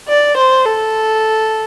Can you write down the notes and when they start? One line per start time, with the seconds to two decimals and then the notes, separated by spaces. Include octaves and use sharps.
0.08 D5
0.37 C5
0.66 A4